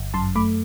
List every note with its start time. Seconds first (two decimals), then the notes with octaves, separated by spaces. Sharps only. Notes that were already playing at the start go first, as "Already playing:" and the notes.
Already playing: G1
0.14 F#2 A5 C6
0.35 A3 B5 D6